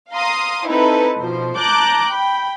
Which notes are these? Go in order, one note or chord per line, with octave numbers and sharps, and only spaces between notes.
F5 A#5 C6 D#6
C4 D#4 E4 A4 B4
B2 F3 C5
A5 A#5 D6 F#6 G6
G5 B5